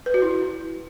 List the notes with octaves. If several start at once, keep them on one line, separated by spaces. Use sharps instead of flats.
B4
F#4
E4